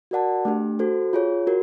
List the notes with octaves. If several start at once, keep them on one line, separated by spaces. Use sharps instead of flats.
F#4 A#4 D5 F#5 A5
A3 D4 G4
F#4 A4 C5
F4 G#4 C#5
F#4 A#4